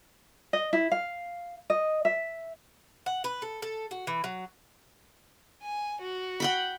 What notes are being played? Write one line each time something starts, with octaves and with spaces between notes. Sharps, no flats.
D#5
E4
F5
D#5
E5
F#5
B4
A4
A4
F#4
E3
F#3
G#5
F#4
F#5 G5 B5